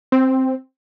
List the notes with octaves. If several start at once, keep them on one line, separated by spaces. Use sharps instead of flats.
C4